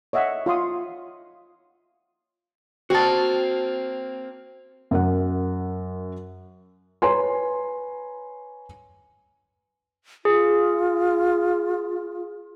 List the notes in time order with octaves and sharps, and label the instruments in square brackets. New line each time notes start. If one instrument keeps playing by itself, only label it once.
[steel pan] C#5 D#5 E5 F#5
F4 C#5 F5 F#5 C6 D#6
[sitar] A#3 C4 [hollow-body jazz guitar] F#4 A5
[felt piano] F#2 A#4 F#5
B4 C#5 G#5 A#5 C6
[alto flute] F4 [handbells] G#4